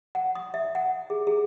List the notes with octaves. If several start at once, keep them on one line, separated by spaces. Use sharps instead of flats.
F#5
D#6
E5
F#5
G#4
G#4